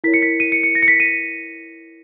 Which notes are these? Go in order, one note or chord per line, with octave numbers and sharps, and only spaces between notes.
E4 A#4 C#5 B6
C#7
B6
D#7
C#7
C#7
A#6
C#7
B6
D#7